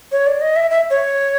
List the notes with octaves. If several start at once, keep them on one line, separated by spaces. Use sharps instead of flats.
C#5
D5
D#5
E5
E5
C#5